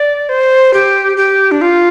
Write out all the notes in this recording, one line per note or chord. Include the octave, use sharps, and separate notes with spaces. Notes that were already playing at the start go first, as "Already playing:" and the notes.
Already playing: D5
C5
G4
G4
D4
F4